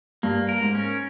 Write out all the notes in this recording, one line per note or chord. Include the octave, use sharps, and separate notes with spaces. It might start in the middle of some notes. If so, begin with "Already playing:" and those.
G2 A#3
A#4
G#2
C#4